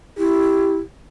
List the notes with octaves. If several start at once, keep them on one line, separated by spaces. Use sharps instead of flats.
E4 G4